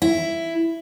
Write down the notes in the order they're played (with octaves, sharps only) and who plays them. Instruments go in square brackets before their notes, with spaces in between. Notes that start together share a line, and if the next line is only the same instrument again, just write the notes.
[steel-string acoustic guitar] E4